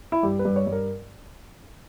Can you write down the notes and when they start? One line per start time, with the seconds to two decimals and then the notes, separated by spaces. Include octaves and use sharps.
0.12 E4
0.23 G2 G4
0.39 B4
0.45 G2
0.56 C#5
0.67 G2
0.72 A#4